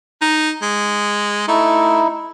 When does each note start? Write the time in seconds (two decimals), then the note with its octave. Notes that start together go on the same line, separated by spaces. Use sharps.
0.21 D#4
0.62 G#3
1.48 A3 D#4 E4